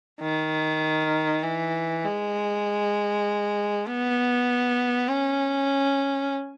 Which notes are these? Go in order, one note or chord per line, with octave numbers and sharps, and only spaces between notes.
D#3
E3
G#3
B3
C#4